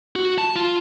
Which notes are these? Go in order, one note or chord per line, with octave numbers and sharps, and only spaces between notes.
F#4
A5
F4